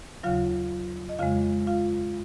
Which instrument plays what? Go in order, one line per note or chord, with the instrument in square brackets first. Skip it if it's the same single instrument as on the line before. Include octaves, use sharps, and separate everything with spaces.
[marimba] D#2 C#3 F#3 F4 F5
D#5
F2 C#3 G#3 F4 F5
F4 F5